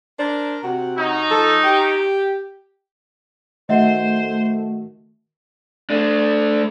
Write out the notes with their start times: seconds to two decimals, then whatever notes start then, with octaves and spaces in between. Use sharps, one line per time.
0.18 D4 A#4 C5
0.63 C3 F#4
0.98 C#4 D#4
1.30 F3 A4
1.64 G4
3.69 D#3 A3 F#4 A#4 C5 D#5 E5 F#5
5.90 A3 D4